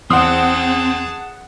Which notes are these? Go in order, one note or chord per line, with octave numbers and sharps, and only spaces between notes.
E2 C4 G#4 F#5 A5 C6 D#6